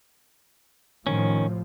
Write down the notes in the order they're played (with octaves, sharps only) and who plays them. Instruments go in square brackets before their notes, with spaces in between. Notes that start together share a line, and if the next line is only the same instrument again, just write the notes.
[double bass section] A2 C3 F3 [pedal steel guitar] D#3 C#4